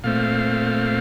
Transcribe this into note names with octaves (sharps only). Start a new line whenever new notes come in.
A#2 A3 C4 F5